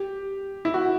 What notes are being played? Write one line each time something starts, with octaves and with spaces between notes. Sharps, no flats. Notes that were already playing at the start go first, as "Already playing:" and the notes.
Already playing: G4
E4
F#4